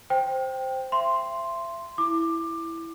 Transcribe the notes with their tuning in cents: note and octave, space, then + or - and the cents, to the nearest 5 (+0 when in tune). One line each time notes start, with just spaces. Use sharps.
C5 +0 G5 +0
E5 +35 C6 +0
E4 +0 D6 +20